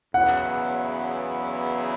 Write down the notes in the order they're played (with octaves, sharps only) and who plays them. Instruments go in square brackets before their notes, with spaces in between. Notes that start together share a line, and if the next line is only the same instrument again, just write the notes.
[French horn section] E2 C#3 F#3 B3 E4 [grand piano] F#5